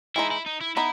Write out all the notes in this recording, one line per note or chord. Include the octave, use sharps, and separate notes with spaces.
E3 G#3 D#4 E4
E4
D#4
E4
B3 D#4 E4